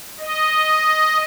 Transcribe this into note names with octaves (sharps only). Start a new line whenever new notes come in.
D#5